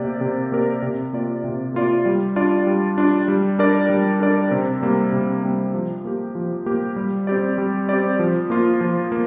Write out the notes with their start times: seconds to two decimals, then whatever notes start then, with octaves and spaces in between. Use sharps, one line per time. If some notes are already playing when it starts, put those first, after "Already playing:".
Already playing: C3 A#3 G4 A#4 D5
0.21 C3
0.52 A#3 G4 A#4 D5
0.82 C3
1.13 A#3 F4 D5
1.44 C3
1.74 A#3 F4 D5
2.05 G3
2.36 D4 F4 D5
2.67 G3
2.98 D4 F4 D5
3.28 G3
3.59 D4 A#4 D5
3.90 G3
4.20 D4 A#4 D5
4.51 C3
4.82 G3 A#3
5.13 C3
5.43 G3 A#3
5.74 F3
6.05 A#3 G4
6.35 F3
6.66 A#3 G4
6.96 G3
7.27 C4 G4 D5
7.58 G3
7.89 C4 G4 D5
8.19 F3
8.50 A#3 F4
8.81 F3
9.12 A#3